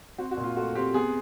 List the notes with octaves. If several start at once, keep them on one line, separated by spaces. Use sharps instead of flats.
C4 F#4
F#4
A#2
F4
A3 F#4
C4 G4
B3 G#4